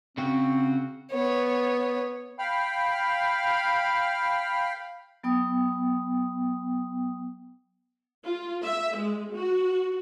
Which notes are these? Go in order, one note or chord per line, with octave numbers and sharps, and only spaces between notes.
C#3 C4 F#4
B3 C#5
F5 G5 B5 F6
F#3 B3 G5 D#6
F4
E5
G#3
F#4